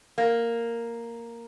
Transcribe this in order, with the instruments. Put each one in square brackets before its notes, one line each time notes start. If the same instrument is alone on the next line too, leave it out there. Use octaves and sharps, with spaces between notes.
[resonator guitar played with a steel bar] A#3